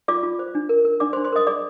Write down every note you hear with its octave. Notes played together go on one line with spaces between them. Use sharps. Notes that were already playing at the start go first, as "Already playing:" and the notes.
F4 D5 D6
F4
C5
D4
A#4
A#4
D4 D5 D6
C5 C6
D4
C5 C6
A#4 D#5 D#6
G#4 D5 D6